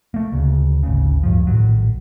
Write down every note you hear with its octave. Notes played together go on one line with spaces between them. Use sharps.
A3 A#3
D2 C#3
G#1 D2 C#3
D1 G2 F3
A#1 A2 D#3 F#3